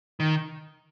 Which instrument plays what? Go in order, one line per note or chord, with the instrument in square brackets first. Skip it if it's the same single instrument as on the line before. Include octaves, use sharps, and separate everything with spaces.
[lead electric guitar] D#3